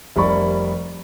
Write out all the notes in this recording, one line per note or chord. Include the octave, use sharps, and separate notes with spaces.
F1 G3 A#4 D5 B5 C#6